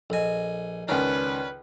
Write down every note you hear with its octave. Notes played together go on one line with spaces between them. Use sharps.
A#1 A4 D#5 G#5
C#2 D#3 C#4 D4 B4